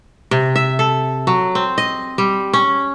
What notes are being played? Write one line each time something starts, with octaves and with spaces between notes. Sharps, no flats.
C3
E5
A4
F#3
C4
D#5
G3
C#4